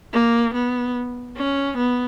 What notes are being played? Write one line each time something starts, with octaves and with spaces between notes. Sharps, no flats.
A#3
B3
C#4
B3